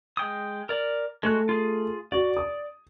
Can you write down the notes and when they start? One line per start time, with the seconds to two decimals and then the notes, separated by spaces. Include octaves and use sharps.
0.17 G#3 G5 D#6
0.69 A#4 D5
1.23 G#3 A3 F#4 F#6
1.49 F4 G#4
2.12 F#4 D5
2.37 D#6